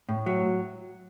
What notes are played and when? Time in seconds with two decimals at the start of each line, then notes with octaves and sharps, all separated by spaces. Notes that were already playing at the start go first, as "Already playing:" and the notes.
0.09 A2
0.26 F#3